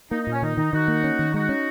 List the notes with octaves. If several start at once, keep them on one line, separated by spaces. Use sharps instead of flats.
A#3 D#4
D#4
A#2
C#4
D#3 D#4
D#3 D#4
D#3 D#4 F#4
A#3
C#4
D#3
G#3 D#4 F#4
C#4